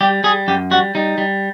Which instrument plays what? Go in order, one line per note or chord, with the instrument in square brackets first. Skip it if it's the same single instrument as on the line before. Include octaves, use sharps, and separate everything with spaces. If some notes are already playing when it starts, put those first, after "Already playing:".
[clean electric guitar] G3 G4
G3 G#4
F#2 G4
G3 F#4
G3 D#4
G3